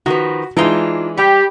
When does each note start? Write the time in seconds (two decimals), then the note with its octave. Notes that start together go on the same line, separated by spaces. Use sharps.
0.06 D#3 F3 F#4 B4
0.57 E3 G#3 D4 D#4 F4
1.17 G3 G4